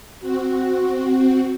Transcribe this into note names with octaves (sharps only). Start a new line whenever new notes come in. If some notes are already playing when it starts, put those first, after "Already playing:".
C4 F#4